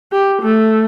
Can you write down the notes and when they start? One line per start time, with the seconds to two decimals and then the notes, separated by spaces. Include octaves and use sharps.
0.12 G4
0.42 A3